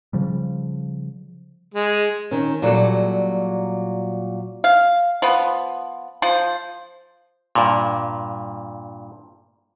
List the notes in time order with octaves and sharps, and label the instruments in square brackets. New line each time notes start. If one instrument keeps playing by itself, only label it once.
[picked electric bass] C#3 F3 G3
[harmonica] G#3
[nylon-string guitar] D#3 C#4
A#2 F#3 G3 A4
[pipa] F5
F3 B3
F3 C5
[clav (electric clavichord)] G2 A#2